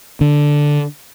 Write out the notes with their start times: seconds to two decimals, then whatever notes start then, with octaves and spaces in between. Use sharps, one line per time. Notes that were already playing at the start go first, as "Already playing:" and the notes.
0.21 D3